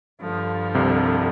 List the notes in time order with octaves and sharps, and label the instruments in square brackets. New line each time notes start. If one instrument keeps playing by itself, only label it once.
[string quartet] G2 D3 F3
[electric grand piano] C2 C3